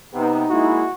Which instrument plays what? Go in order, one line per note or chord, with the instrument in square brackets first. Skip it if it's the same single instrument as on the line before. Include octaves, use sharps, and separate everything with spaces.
[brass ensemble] C3 B3 [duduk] D#4
[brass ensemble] G#3 A#3 E4 [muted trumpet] F#4